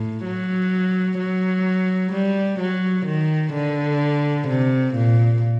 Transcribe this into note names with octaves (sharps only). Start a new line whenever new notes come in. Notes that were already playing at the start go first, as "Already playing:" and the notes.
Already playing: A2
F#3
F#3
G3
F#3
D#3
D3
C3
A#2